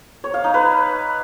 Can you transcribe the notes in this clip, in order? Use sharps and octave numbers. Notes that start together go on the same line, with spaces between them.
C#5
F5
D#4
B4